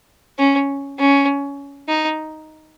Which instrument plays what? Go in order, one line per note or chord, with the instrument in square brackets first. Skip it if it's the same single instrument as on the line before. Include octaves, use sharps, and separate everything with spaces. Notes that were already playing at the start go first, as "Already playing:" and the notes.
[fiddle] C#4
C#4
D#4